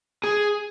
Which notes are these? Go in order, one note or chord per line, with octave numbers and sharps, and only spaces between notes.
G#4